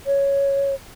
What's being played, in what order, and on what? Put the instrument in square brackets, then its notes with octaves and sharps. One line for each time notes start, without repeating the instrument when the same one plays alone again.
[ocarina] C#5